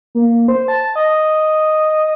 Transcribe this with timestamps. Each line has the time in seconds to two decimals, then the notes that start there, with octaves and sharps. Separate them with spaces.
0.15 A#3
0.48 C5
0.68 A5
0.96 D#5